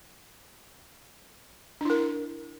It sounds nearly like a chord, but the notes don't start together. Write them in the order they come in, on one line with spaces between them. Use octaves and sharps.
D4 E4 A#4